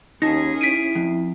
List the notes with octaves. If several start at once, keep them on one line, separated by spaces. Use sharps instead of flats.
D#2 C#4 D#4 G#4 A5 A#6
E4 B6 D7 D#7
F2